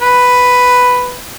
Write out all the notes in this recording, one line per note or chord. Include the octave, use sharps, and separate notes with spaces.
B4